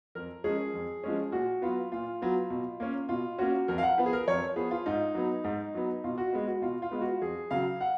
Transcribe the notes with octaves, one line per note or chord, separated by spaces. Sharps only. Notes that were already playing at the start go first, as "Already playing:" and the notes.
F2 A#4
F3 G#3 C#4 G#4
F2
F3 G#3 C#4
A#2 F#4
F#3 B3 F4
A#2 F4
F#3 B3
B2
A#3 C#4
B2 F4
A#3 C#4 F#4
F2 A#4
F5
F#5
F3 B3 B4
G#4
A#4
F2 C#5
F3 B3 G#4
F4
G#2 D#4
F#3 B3
G#2
F#3 B3
B2 F4
F#4
G#3 B3
F#4
B2 F4
F4
G#3 B3
F#4
F2 G#4
C#3 F#3 F5
F#5